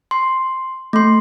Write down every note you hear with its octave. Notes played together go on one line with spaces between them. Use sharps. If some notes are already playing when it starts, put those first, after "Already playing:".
C6
A3 C6